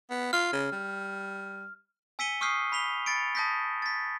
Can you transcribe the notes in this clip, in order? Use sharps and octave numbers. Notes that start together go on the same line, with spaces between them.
B3
F4 F6
C#3
G3
G#5 E6 B6 C#7 D#7 G7
C#6 D#6 F6 G6 C7
B5 B6 F7 G7
B5 A6 C#7 D7
A5 D#6 G6 A#6 B6
A6 B6